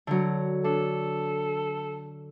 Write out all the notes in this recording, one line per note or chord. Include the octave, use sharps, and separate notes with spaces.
D3 F#3
D4 A4